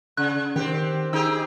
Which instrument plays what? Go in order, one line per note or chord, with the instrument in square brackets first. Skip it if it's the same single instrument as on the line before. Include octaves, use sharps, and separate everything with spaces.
[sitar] C#3 [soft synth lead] F#6
[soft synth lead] D#3 [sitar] C4 G4
[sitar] D#4 G4 G#4 [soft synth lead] E6